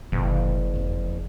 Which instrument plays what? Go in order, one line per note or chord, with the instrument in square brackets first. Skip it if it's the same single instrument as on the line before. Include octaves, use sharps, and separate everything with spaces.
[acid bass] F#1 [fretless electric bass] A#2 D3 F3
[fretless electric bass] E1 F2